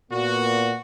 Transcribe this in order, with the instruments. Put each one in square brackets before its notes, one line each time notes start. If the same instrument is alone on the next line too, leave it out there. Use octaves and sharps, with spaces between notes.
[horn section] A#2 B3 F#4